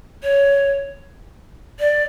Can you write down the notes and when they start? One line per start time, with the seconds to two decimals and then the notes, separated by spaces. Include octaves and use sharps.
0.23 C#5
1.80 D5